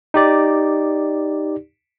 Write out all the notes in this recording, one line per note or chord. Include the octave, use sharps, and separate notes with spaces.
D#4 G4 D5